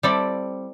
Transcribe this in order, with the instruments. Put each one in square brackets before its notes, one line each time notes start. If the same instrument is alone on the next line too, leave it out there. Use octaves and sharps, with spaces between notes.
[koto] G3 C4 E4 A4 D5